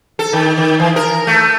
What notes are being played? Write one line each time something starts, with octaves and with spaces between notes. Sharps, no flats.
A4
D#3
D#3
E3
A#4
A3